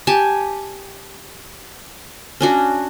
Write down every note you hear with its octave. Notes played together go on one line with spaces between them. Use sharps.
G4 G#5 A5
C#4 D4 F#4